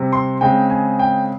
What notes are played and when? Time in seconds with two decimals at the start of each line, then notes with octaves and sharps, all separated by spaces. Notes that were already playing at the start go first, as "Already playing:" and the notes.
Already playing: C3 G3 C4
0.12 C6
0.41 C#3 G#3 C4 G5
0.70 G#5
0.99 G5